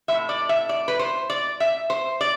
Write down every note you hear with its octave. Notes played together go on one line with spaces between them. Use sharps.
A2 G#3 E5
D5
E5
D5
B4
C5
D5
E5
C5
D5